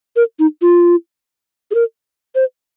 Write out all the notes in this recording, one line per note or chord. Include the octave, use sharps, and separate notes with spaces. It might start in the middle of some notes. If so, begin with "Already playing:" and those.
A#4
D#4
F4
G#4
A#4
C5